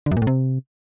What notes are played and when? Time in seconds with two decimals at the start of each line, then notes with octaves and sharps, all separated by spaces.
0.06 D3
0.11 F#2
0.17 A#2
0.22 A2
0.27 C3